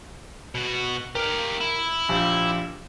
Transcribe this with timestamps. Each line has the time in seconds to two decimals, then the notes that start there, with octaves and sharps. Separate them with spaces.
0.55 B2 F#4
1.15 G4 A#4 F5
1.61 E4
2.09 A#1 F4 G4